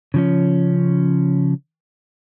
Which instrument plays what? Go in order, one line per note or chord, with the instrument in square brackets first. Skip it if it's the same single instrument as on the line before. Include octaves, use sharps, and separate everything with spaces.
[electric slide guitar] C#3 F3 C#4